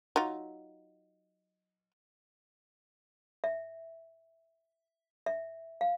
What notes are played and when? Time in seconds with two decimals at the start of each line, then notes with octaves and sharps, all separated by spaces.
0.16 F#3 D#4 F4
3.44 E5
5.26 E5
5.81 F5